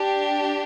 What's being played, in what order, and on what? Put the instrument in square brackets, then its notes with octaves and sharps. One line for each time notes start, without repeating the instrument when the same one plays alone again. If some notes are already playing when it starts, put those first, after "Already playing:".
Already playing: [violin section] D4 G4